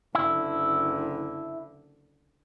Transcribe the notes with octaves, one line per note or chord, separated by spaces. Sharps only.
F#1 D3 E4